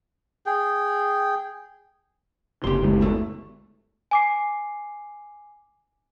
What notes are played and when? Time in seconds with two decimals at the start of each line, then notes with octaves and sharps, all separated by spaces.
0.46 G#4 G5
2.64 F#1 C3 G4 C6
2.82 F#1 D2 G#3
3.01 B2 A3
4.11 G#5 D6 C7